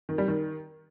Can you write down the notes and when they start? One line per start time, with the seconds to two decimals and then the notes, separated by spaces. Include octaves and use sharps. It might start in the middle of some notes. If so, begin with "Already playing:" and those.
0.09 D#3
0.18 G3
0.28 D#3